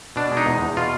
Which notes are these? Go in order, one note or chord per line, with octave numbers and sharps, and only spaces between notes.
B2 D4
G#3
D#4
E2
E2
B2 F4